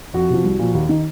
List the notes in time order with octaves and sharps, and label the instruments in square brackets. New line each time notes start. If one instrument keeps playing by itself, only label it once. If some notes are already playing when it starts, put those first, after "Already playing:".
[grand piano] F2 F#4
C3 F3
C2
A#2 F3
D#2
D#3